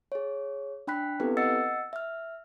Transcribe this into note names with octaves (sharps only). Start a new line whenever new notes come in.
G#4 C#5
D4 G5 B5 F#6 B6
B3 C4 E4 G4 A4 B4
D#5 F#5 E6 A6 C#7
E5 F6